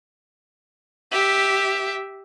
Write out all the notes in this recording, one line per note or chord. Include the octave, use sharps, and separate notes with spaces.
G4 E5